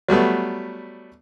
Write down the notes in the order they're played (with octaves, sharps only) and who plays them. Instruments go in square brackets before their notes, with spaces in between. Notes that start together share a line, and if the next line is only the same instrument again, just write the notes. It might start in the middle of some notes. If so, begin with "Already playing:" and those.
[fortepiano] F#3 G3 A3 B3